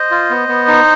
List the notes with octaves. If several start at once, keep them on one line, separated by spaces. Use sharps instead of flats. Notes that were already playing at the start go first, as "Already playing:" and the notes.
Already playing: C5 D#5
F4
B3
B3
D#4